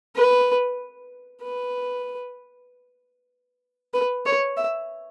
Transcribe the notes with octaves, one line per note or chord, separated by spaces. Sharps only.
B4
B4
B4
C#5
E5